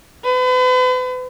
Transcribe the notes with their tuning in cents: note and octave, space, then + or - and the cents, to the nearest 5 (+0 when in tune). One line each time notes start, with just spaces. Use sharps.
B4 +40